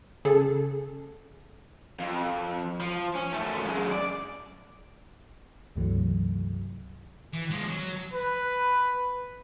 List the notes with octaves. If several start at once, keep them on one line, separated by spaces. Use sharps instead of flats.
C#3 G#4 A4
F2
F3
C#4
F#2 A3
F#2 G#3
D5
C#2 G2 C3 E3 F#3 A3
E3
F3 G#3
F#3
B4